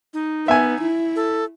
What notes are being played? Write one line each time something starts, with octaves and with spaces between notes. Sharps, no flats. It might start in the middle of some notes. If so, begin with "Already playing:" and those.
D#4
B3 E5 G#5
E4
A4